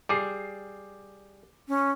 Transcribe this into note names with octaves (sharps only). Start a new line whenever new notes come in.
G3 G#4 D6 C7
C#4